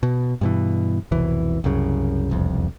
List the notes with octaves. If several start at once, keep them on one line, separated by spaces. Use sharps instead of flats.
B2
G2 B2 E3
F1 C2 B2 E3
C2 F#2 C#3
E1 C2 F2